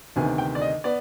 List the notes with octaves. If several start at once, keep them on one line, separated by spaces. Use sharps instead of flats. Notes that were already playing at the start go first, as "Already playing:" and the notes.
D2 C3 D#3 B3 G#5
G5
D5
D#5
B3 D5